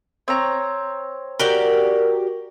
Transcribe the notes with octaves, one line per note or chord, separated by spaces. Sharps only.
C4 C#5 A#5
F#4 G4 A#4 D5